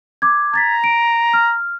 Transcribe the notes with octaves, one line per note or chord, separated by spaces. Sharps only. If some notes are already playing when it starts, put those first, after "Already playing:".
D6 G#6
A#5 G#6 A6 B6
D7
F6